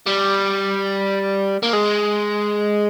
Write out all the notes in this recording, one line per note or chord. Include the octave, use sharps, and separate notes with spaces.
G3
A#3
G#3